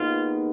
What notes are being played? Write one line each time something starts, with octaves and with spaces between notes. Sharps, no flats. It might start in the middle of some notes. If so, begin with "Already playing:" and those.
Already playing: D#2 D#3 G#3 B3 F4